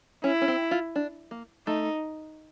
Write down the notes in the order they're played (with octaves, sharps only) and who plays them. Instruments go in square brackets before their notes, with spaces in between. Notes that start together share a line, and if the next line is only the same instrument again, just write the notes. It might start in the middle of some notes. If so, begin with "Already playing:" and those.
[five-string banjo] C#4 [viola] E4
[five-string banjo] C#4
C4
F4
D4
A#3
[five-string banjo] A3 [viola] D#4